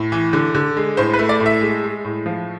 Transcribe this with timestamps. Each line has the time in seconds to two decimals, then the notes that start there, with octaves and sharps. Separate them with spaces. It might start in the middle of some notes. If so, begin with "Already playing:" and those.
Already playing: A2
0.12 E3
0.33 D3
0.55 D3
0.77 G#3
0.97 A2 C5
1.13 B4
1.19 A3
1.29 D5
1.40 A2
1.46 E5
1.61 G#3
1.84 G#3
2.05 A2
2.26 F3